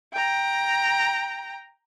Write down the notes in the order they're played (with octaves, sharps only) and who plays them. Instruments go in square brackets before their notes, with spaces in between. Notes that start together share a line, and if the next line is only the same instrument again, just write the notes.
[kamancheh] G5 A#5